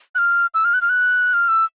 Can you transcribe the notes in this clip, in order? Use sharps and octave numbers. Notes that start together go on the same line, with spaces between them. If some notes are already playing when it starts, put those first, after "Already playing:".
F#6
F6
E6
F6
F#6
F6
F#6
F6
E6